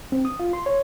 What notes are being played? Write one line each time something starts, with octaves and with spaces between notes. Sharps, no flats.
C4
D#6
F4
C6
C#5